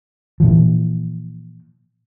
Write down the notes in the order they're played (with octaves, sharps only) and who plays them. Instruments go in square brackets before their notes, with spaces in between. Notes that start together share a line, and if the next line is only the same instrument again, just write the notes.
[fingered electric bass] A#2 E3 F3